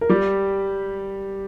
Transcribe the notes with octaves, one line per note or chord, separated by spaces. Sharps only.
A#4
G3 G4